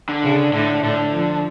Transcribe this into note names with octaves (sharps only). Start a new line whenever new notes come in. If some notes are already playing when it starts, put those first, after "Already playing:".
D3
C#3
A2 D3
A2 D3
F3